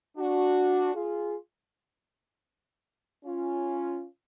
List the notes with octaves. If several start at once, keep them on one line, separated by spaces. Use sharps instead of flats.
D4 F#4
F4 G#4
C#4 F4